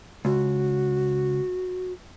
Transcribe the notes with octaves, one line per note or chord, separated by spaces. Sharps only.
C#2 F#4